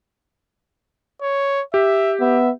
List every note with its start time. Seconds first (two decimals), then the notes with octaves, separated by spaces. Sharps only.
1.22 C#5
1.74 G4 E5
2.20 B3 E5